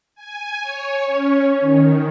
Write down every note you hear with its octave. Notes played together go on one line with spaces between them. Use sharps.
G#5
C#5
C#4
D#3